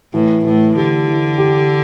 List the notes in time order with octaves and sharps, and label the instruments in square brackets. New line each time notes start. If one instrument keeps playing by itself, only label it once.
[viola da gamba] A2 [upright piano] E3
[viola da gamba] A2 [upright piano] E3
[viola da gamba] D3 [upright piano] G4
[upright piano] E3
G4